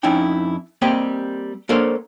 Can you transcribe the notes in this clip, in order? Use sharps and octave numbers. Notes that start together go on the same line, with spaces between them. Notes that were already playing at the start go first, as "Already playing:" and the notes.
F2 C#4 D#4 E4 G5
G3 A#3 C4 G4 D#5 G5
A#3 D4 A4 A#4 C5 C#5